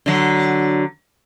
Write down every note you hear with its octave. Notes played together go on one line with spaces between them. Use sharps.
D3 F#3